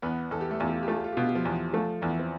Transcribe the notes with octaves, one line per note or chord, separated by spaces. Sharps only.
E2 B3 B4
E2 A4
G4
A3 A4
E2 F4
G4
F4
G4
A3 F4
G4
F4
G4
B2 F4
G4
F3 F4
E2
F3 A3 F4
E2 E3 E4
C4